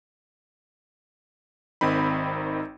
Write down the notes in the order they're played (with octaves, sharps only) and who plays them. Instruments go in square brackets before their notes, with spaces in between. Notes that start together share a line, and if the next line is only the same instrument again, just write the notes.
[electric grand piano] G#1 D#3 C4 D#4 B5